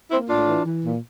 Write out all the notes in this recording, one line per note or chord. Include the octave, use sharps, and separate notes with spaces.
A#3 C4 E4
A2 D4 F4
E3
E3
A#2